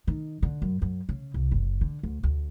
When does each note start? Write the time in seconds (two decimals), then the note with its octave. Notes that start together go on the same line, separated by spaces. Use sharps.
0.07 D#3
0.42 D3
0.62 F#2
0.82 F#2
1.09 C#3
1.34 C2
1.51 F#1
1.81 D3
2.03 D2
2.23 D2